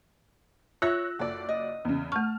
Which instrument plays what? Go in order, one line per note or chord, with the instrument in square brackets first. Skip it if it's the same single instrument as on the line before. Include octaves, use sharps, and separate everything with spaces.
[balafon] F4 E5 [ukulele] C#5 [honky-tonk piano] E6 F#6 A#6
[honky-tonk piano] F#1 D5 [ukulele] A4
[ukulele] D#5
[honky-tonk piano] E2 C#3
[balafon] A3 C#6 [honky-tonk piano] A5 F6